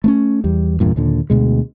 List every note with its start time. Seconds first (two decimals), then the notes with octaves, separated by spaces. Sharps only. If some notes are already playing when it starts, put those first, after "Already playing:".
0.04 A3 B3 C#4
0.44 E2 G3
0.80 G1 E2 G2 A#2
0.96 D#2 A#2 D3
1.30 D2 B2 G#3